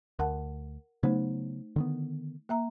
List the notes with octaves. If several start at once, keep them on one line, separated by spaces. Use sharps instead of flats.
D2 A#4 F#5 A5
C#3 F#3 A3 B3 D#4 C5
D3 D#3 B3
A#3 E5 A#5